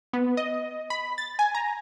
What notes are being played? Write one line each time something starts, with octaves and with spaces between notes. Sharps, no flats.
B3
D#5
B5
A6
G#5
A#5